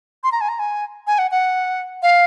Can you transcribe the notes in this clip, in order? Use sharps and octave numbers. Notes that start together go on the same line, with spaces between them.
C6
A#5
G#5
A#5
G#5
G#5
F#5
F#5
F5